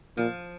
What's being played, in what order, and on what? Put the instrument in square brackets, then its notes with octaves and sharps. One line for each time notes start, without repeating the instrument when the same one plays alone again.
[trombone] A#2 [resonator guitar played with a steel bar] F3